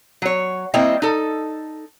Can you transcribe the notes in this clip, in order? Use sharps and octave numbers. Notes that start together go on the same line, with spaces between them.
F#3 C#5
G3 A#3 C4 E4 D#5 G5
D#4 A4